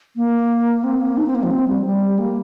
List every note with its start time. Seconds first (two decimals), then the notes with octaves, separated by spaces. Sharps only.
0.16 A#3
0.84 C4
1.01 A#3
1.17 D#4
1.26 C4
1.35 A#3
1.43 F3
1.51 C4
1.68 G3
1.85 G3
2.19 A#3